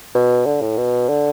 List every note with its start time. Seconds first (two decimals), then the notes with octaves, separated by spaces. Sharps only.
0.15 B2
0.46 D3
0.62 A2
0.78 B2
1.09 D3